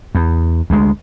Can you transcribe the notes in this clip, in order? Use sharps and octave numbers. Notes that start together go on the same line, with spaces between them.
E2
D2 G#3